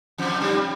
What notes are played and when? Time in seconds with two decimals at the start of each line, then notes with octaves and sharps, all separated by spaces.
0.18 F2 F3
0.41 G2 G3